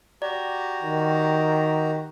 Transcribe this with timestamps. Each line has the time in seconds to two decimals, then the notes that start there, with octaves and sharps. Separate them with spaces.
0.22 F#4 G4 D5 A#5
0.83 D#3